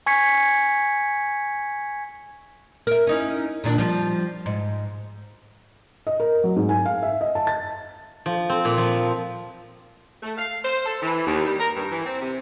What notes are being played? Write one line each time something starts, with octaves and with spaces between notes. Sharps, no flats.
G#5 C#6 G#6 B6 C#7
A#4 E5
C#4 D#4 E4
A#2 D#3 D4
F3 G3
G#2
D#5
A#4
F#3
G#2
G#5
F5
E5
D#5
A5
A6
F3
C4
A#2
F3
A3
F5
C5
A4
E3
D#2
G3
A#4
G2
E3
C4
C3